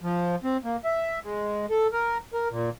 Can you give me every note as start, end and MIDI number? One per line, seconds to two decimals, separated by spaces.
0.02 0.36 53
0.44 0.57 60
0.64 0.77 58
0.85 1.19 76
1.24 1.66 56
1.70 1.87 69
1.93 2.18 70
2.33 2.48 70
2.51 2.70 46